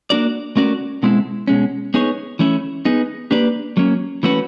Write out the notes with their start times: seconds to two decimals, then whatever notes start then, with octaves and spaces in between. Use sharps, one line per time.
0.10 A#3 D4 F#4 A#4 D5
0.57 A3 C#4 F#4 A#4 D5
1.03 B2 G#3 C4 E4 A4
1.48 B2 G#3 C#4
1.94 B3 D#4 G#4 C#5
2.39 E3 A3 C#4 E4
2.85 B3 D#4 G#4
3.31 A#3 D4 G4 B4 D5
3.77 F#3 A#3 C#4
4.23 E3 A3 C#4 F#4 B4